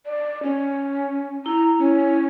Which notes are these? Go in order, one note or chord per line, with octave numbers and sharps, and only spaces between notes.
D5
C#4
E4 A#5
C#4